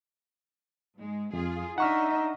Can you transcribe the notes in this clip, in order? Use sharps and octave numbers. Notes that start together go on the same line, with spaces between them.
G#2 G#3
F2 F4 G#4
D4 D#4 D#5 E5 F#5 C#6 F6